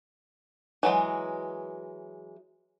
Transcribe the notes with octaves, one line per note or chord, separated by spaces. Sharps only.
E3 F#3 G#3